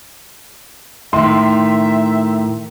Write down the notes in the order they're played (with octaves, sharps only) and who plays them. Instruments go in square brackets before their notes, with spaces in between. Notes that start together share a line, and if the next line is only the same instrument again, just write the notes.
[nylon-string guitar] A2 D#3 [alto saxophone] E5 [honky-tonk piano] C6